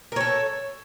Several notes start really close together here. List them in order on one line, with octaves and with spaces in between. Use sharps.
A#4 C#5 A4